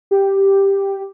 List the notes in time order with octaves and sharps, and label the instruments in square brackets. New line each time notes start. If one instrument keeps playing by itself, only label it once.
[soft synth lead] G4